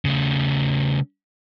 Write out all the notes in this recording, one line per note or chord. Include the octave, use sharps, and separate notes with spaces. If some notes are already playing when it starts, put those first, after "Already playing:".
C#3 A3